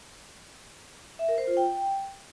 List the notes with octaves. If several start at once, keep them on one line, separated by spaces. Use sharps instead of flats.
E5
A#4
C5
F4
G5